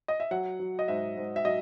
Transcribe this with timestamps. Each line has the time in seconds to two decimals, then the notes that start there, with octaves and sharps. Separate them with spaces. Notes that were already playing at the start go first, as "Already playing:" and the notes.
0.08 D#5
0.20 E5
0.31 F#3 F#5
0.59 F#3
0.79 D#5
0.88 G#2 E5
1.17 G#2
1.36 E5
1.45 F#3 D#5